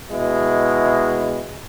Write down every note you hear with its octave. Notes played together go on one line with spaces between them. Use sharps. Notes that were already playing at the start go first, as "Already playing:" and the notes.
B2 G#3 E4